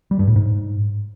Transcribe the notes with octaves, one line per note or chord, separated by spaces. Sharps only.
G3
G2
A2
G#2